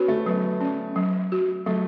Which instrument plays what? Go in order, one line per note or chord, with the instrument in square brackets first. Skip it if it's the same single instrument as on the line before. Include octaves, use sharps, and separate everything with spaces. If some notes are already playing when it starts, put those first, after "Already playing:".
Already playing: [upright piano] B3 C#4 [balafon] F#4
[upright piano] A3
[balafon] F#3 [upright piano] B3
[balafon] C#4
F#3
F#4
[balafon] F#3 [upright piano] A3